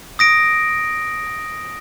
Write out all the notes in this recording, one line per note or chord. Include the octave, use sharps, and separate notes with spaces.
D#6 A#6 D7